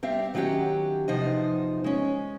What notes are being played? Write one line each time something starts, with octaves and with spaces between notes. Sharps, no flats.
G3 C4 E5 F5
D#3 F#3 C#4 E4 G4 F#5
E2 C3 F3 D#4 C5 D#5
G#3 C#4